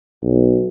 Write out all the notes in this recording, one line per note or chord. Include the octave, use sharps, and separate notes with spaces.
B1